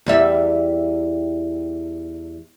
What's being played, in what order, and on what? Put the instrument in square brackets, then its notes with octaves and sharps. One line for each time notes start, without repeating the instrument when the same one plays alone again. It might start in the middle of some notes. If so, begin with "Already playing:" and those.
[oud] E2 G3 E5